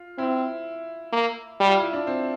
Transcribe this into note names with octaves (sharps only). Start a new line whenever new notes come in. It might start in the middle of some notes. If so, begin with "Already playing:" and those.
Already playing: F4
C4 E4
A#3
G3
F4
E4
D4
C4